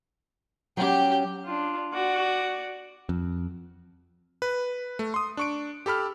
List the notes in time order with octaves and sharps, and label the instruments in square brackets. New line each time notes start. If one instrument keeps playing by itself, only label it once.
[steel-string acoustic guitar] F#3 C#4 [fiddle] G4 G5
[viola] D4 F4
F#4 D5
[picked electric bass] F2
[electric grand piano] B4
A3
C6 D#6
D4 C#6 D7
G4 A4 B5 F6